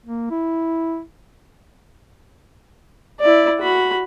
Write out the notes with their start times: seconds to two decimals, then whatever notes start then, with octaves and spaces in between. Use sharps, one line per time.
0.06 A#3
0.31 E4
3.20 E4 D5
3.60 F#4 B5